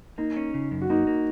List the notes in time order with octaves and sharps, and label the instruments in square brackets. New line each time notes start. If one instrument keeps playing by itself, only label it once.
[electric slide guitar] A#3 [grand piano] D#4
[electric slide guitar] C#4
C#3
F#2
[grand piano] F#4
[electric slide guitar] A#3 [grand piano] D#4
[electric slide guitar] A#3